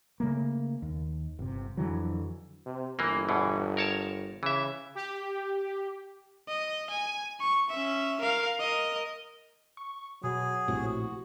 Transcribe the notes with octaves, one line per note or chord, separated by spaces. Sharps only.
C#3 A3 A#3
D#2
G1 C3
F2 D3 E3 F#3
C3
G1 E3 A#3
E2 B2 E3
A#4 C#5 A5
C#3 E3 E5
G4
D#5
G#5
C#6
C#4 E5
A#4 F5
A#4 D#5
C#6
B2 F#3 G#4
A#1 A2 C3 F#4